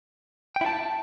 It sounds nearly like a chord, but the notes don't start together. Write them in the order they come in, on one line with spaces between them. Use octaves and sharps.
G5 E4 A5